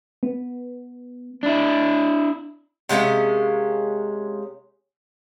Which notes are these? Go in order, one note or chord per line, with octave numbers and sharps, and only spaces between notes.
B3
D4 E4
C3 G#3 A#3 C#4